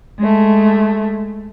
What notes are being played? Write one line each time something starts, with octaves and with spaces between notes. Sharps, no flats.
G#3 A3